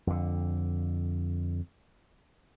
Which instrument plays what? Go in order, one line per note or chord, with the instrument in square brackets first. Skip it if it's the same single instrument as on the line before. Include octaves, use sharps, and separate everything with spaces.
[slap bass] F2 D3